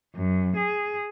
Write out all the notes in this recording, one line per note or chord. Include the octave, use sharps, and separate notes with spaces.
F#2
G#4